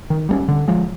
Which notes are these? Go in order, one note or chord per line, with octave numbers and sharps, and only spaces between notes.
D#3
G3 A#3 C#4
D3
F3 G#3